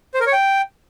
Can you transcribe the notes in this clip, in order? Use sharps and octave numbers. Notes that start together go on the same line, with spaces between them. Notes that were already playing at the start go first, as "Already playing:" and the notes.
C5
A#4
C#5
G5